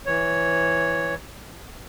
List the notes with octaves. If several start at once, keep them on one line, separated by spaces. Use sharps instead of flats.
E3 C#5